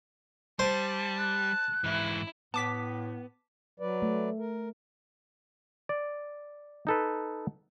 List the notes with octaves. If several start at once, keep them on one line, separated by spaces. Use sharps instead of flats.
G3 C5 A5
F#6
G#2 E3 E4
A2 B3 A5 D6 B6
F#3 B4 D5
A3
A#4
D5
D#4 A4 B4